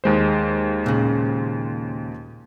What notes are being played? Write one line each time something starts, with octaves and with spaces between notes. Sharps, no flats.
D#2 G#3 C5
A#2 C#3